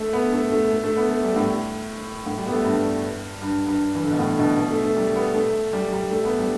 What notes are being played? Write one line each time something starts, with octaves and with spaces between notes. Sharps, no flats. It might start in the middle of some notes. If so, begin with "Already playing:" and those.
Already playing: A3
B3
A3
A3
A3
A3
B3
A3
G3
A2
A2
G3
B3
A3
G2
G2
G2
E3
D3
B2
A2
D3
B2
B2
A3
A3
G3
B3
A3
G3
G3
A3
B3
G3